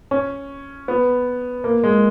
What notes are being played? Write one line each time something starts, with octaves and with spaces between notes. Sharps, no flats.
C#4
B3
A#3
G#3